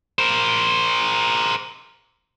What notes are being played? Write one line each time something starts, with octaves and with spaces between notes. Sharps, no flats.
A#4 C5